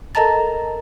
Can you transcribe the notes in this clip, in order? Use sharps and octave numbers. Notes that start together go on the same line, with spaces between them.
A4 A#4 D#5 A5 A#5 A6